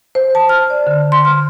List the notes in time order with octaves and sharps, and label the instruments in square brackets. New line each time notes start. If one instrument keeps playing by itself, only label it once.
[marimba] C5
A5
F6
D5
D3
C6
F6